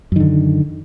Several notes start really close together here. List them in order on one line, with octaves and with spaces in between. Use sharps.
F#2 D#3 D3